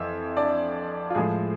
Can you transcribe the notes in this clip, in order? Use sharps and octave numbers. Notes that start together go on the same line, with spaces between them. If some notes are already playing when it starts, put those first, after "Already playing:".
Already playing: F2 E3 E4 E5
D4 D5
F4
A2 F3 G#3 G#4